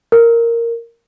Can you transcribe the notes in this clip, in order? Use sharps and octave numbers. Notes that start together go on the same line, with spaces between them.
A#4